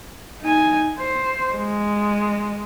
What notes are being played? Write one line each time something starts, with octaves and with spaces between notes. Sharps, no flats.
D#4 G#5
C5
G#3